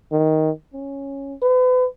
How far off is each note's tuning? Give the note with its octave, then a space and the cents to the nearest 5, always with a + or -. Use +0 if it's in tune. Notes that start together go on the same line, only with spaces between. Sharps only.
D#3 +10
C#4 -5
B4 +40